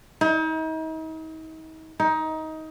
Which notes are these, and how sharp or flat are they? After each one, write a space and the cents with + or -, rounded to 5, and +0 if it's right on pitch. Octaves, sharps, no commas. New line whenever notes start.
D#4 +40
D#4 +20